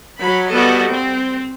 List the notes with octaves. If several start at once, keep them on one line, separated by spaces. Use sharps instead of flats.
F#3 B5
G3 B3 F#4 A4 D#5
C4